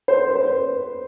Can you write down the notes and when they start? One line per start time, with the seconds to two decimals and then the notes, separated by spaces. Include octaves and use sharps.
0.08 C5
0.28 B4
0.35 C5
0.43 B4